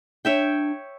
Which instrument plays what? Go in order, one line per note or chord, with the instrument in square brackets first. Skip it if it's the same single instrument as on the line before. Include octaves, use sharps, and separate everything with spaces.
[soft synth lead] D4 [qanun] C#5 E5 G5